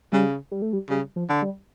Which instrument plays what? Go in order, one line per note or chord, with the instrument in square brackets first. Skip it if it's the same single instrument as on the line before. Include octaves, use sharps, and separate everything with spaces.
[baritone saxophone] C#3 [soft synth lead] G3
[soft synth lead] G3
A3
G3
[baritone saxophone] C#3 [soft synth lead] G3
[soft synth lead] F3
[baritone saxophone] D3
[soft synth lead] G3